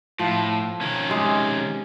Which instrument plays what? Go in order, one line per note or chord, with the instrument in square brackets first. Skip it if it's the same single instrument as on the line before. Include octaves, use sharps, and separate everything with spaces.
[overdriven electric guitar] A2 [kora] F3
[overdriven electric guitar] D#3 C#4
[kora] C3 G#3